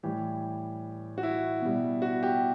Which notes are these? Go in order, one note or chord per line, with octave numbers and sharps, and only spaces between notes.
A2 E3 G3 G4
F#4
E4
B2 G3
F#4
G4